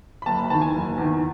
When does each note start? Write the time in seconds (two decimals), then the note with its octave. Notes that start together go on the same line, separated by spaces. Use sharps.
0.22 B5
0.26 F#1 A5
0.38 B5
0.50 E2 D#3 A5
0.62 G#5
0.74 F#1
0.98 E2 D#3